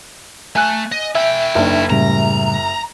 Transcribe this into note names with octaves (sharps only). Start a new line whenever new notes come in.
A3 G#5 F#6
D#5
E4 E5 G5
F#1 D4 D#4
A2 C#3 G3 A#5